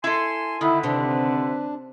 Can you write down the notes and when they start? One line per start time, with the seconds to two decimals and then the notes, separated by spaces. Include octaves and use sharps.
0.04 E4 A4 G#5 C6
0.61 D3 D#3 E4 B4
0.83 C3 D4